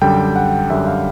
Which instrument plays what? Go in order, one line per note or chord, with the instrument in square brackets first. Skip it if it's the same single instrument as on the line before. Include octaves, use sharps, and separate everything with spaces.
[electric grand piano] F#2 D3 G3 G5
F#5
F#2 D3 G3 E5
F5